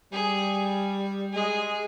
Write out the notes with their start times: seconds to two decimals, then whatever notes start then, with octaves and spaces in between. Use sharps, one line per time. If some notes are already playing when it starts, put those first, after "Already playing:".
0.12 G3 G#4
1.34 G#3 G#4